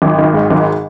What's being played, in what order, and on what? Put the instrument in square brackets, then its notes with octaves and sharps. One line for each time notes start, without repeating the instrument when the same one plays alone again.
[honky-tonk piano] G#1
D#3
G#2
G#1